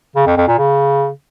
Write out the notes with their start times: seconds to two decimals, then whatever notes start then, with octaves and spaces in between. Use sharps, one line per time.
0.16 C#3
0.27 F2
0.37 F2
0.48 A#2
0.58 C#3